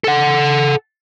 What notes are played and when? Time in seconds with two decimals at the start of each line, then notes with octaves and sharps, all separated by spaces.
0.04 A4 F#5